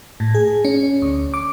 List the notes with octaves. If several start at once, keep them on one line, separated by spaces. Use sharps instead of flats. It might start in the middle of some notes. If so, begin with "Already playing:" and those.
A2
G#4
C#4
D2
D6